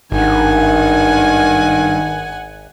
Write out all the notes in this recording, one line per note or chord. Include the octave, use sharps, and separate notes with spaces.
G#1 G2 D#3 F#5 G#5